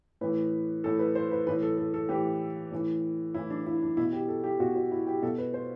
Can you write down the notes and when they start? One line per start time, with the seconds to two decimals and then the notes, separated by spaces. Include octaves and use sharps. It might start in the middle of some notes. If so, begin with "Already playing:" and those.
0.21 A2 E3 B4
0.84 A2 E3 A4
0.99 B4
1.15 C5
1.31 B4
1.47 A2 E3 B4
1.62 A4
1.77 A4
1.94 A4
2.09 A2 E3 G4
2.71 A2 E3
3.34 A2 E3 E4
3.50 D4
3.66 E4
3.82 D4
3.97 B2 E4
4.13 G4
4.28 A4
4.44 G4
4.60 B2 F#4
4.76 F#4
4.91 E4
5.07 G4
5.22 B2 A4
5.38 B4
5.54 C5